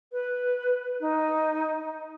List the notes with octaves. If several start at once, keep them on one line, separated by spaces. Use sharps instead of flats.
B4
D#4